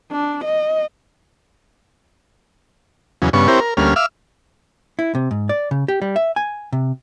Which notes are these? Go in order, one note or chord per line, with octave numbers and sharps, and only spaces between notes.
D4
D#5
E2 C#3 F#3
G2 C#3 B3 C#6
C4 E4 G4 A#4 C5 C#5
A#4
D2 G3 A#3 C#4 F6
E5 F5 D6 E6 F6
E4
C3
G#2
D5
C#3
G4
G3
E5
G#5
C3